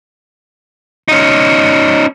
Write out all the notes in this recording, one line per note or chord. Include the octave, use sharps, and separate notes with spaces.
C#4 D#4